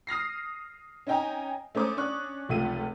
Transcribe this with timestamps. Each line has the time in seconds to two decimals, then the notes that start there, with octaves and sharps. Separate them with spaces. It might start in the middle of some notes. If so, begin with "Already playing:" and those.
0.07 D#6 F6 A#6 C7
1.07 C#4 D#4 D#5 G5 G#5 A#5
1.75 A3 C#4 C5 D6 D#6
1.97 C#4 D4 C#6 F#6
2.49 F1 C#2 A3 F4 D#7